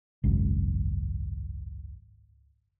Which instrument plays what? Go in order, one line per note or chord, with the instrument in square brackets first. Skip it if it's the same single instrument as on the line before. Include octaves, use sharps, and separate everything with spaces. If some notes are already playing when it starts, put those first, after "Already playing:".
[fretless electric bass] G#1 C#2 F#2